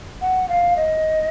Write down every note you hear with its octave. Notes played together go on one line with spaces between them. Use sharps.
F#5
F5
D#5